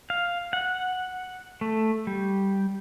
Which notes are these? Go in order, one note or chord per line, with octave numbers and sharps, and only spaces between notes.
F5
F#5
A3
G3